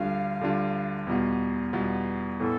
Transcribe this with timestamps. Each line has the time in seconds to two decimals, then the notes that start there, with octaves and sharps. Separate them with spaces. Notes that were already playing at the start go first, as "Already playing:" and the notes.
Already playing: D2 D3 G3 D4 F4 F5
0.41 D2 D3 G3 D4 F4
1.07 E2 B2 G3 B3 F4
1.73 E2 B2 G3 B3 F4
2.40 A2 E3 B3 A4